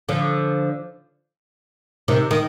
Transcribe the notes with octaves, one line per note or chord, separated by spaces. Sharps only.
D3 F3
C3 D#3
D#3